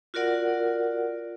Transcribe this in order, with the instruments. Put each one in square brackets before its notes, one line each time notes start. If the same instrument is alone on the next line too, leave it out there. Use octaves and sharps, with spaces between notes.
[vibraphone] F4 F#4 A#4 D5 F#5